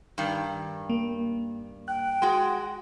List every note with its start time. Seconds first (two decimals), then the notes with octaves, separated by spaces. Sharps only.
0.18 G2 D#3
0.89 A#3
1.88 G5 F#6
2.22 G#3 F#4